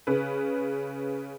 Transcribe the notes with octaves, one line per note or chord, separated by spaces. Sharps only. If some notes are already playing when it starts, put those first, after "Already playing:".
C#3 B4